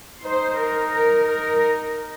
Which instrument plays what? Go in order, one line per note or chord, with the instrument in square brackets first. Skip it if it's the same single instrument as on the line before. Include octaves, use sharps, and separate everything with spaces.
[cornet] D#4 [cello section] C5
[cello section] A#4
A#4
A#4